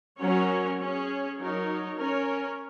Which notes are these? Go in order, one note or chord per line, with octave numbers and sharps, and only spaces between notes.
F#3 C#4 A#4 C#5
C#4 G#4 C#5
F#3 D#4 A#4 C#5
C#4 A#4 C#5